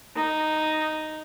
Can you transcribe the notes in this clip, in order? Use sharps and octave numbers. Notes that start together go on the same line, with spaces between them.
D#4